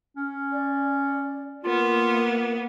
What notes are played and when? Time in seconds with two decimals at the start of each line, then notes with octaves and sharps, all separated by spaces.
0.16 C#4
0.51 D5
1.64 A#3 B3 F4 A#4